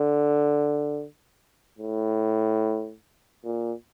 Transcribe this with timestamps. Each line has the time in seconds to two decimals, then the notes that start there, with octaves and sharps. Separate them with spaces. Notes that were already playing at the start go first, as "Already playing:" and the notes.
Already playing: D3
1.79 A2
3.44 A#2